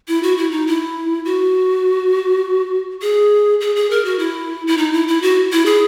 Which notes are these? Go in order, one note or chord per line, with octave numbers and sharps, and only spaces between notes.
E4
F#4
E4
D#4
E4
F#4
G#4
G#4
G#4
A#4
F#4
E4
E4
D#4
E4
E4
F#4
E4
G#4